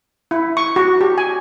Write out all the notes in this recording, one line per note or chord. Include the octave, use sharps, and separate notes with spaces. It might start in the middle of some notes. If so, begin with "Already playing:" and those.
E4
C#6
F#4
G4
G#5